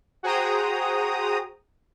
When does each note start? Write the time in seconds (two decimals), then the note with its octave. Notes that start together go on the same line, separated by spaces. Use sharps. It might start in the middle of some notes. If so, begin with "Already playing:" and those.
0.23 F#4 G#4 C5 G5 A#5 D#6